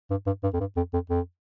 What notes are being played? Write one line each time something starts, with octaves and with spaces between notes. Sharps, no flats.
G2
G2
G2
F2
G2
F2
F2
F2